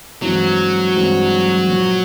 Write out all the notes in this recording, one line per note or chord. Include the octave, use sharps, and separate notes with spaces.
G2 E3 F#3 G#3 C4 E4
G2 E3 G#3 C4 E4
A#2 F3 A#3